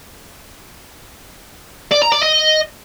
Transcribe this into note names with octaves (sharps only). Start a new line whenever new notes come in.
D5
A#5
D5
D#5